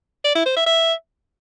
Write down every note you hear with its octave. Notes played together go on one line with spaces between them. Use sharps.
D5
E4
C5
E5
E5